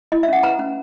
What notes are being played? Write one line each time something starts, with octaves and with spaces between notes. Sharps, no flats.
E4 D#5
E5
C#4 F#5
B4 A#5
C#4